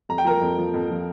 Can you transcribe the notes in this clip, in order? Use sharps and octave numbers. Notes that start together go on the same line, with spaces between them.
F2 A#5
G5
F3 A#4 A#5
F2
F3
F2
F3